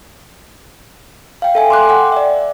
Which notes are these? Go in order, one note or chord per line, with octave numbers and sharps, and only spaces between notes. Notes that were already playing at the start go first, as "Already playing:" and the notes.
F5 G5
A4 E5 G#5
C6 D6 F#6
F#5 G5
D5 E5